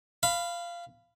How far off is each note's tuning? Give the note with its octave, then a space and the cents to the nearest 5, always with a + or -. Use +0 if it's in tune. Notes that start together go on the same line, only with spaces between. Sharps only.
F5 -15 B5 +15